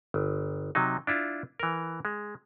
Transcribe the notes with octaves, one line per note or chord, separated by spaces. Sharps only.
G1
C3 F#3 D#4
D4 E4 F4
E3 A#4
G#3